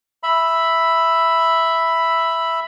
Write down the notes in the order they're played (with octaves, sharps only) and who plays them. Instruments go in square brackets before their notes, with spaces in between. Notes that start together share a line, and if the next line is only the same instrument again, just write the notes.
[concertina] E5 B5